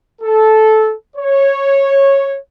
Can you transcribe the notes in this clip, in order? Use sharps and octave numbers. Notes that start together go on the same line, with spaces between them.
A4
C#5